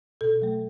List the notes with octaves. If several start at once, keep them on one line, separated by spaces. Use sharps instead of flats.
B2 A4
F#3 A3